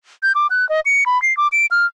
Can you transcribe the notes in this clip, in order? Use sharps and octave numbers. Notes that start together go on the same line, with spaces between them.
G6
D6
F#6
D#5
C#7
B5
C7
D6
D7
F6